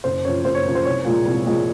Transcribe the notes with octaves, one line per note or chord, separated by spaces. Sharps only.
F#1 C5
F#2 F3 C#5
F#1 C5
C#5
F#2 F3
C5
C2 C#5
A#2 F3 G#3
C2
A#2 F3 G#3